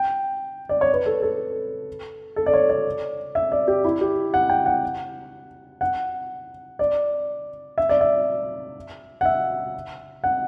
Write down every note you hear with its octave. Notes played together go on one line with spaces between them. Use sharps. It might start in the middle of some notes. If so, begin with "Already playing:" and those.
Already playing: G5
D5
C#5
B4
A4
A4
A4
D5
C#5
D5
E5
D5
G4
E4
G4
F#5
G5
F#5
F#5
D5
E5
D5
E5
F#5
E5
F#5